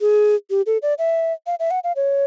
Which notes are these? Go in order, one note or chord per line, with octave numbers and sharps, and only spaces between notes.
G#4
G4
A4
D5
E5
F5
E5
F#5
F5
C#5